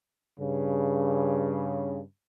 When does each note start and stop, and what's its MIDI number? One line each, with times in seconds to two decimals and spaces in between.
0.39 2.01 43
0.39 2.01 49